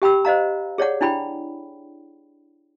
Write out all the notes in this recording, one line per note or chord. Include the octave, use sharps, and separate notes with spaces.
G4 G5 B5 E6
C5 D#5 F5 A#5
G#4 C#5 D5 F#5
D4 E4 G5 B5